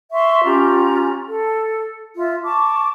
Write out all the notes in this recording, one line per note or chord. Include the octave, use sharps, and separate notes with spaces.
E5 C6 C#6
C#4 F4 G4 A#5
A4
F4 E5
A5 C#6 D6